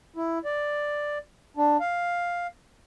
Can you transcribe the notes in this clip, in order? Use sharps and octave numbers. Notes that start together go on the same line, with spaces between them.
E4
D5
D4
F5